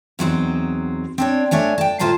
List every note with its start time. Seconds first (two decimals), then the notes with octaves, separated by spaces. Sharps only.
0.19 E2 F#3 C4 D#4
1.18 C4 D4 C#5
1.51 A3 D4 C#5 G#5
1.78 G5 A5
1.99 D2 A2 F4 C5 A5 A#5